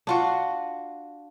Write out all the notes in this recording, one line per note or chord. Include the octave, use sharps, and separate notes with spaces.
D4 F4 F#4